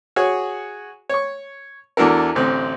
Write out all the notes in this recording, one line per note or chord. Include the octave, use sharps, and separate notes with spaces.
F#4 G#4 C#5
C#5 C#6
E2 E3 D4 F#4 A4 A#4
A1 D2 C4